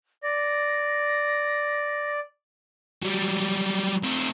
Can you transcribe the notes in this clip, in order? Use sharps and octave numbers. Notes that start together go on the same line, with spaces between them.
D5 A#6
F#3 G3
A3 C4